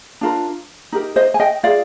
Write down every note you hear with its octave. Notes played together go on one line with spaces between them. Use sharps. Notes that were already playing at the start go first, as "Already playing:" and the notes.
D4 F4 A#4
D#4 G4 A#4
C5 D#5
G#5
D#5 G5
F4 G#4 D5 F5